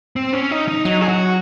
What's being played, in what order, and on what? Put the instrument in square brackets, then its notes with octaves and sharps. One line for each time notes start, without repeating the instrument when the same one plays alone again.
[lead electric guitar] C4
C#4
D#4
D#4
[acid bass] F#3 [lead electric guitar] D#4
[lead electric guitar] G#4
F#4